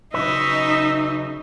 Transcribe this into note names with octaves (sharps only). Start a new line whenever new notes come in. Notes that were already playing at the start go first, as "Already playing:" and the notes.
C#3 F#3 D#4 B4 E5